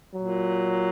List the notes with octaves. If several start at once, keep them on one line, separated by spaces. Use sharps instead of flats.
A#2 F#3